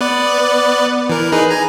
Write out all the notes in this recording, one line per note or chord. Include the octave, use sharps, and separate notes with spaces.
B3 B4 D5
E3 A#4
D#4 G#4 B4
G#5 A#5